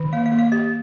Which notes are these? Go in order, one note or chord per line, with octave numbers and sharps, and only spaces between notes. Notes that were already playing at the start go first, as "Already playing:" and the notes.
Already playing: D#3
A#3 F5
F5
A#3
F5
G4 D#5